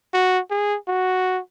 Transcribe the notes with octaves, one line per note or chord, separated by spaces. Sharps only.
F#4
G#4
F#4